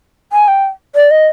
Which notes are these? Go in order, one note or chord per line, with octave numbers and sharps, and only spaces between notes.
G#5
G5
D5
D#5